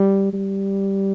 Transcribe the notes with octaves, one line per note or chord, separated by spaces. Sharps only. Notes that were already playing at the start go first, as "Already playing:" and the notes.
Already playing: G3
G3